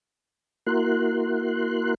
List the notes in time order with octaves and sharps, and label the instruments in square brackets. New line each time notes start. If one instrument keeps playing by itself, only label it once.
[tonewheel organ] A#3 E4 F#4 A#4 C6 F#6